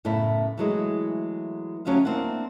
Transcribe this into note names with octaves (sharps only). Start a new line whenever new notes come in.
F#2 A2 C#3 B3 E5
E3 F#3 G#3 A3
D2 F#3 C#4 F4 E5 F5
A#3 C4 D4 E4 F#5